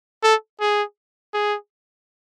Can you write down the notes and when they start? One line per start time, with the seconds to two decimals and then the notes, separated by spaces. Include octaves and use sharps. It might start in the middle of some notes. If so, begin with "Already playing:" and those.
0.24 A4
0.60 G#4
1.34 G#4